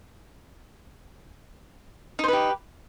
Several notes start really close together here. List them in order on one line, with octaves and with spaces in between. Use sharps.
D#4 C5 B4 G4